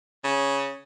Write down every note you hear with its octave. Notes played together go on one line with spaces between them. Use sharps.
C#3